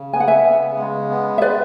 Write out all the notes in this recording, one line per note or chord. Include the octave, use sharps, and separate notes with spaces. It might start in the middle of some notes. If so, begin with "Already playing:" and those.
Already playing: C#3
B3 G#5
F#5
E5 G#5
C#3
G#3
B3
E5
G#3 B4 D5